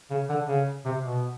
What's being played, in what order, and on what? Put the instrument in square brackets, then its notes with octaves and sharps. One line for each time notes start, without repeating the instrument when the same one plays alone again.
[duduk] C#3
D3
C#3
C3
B2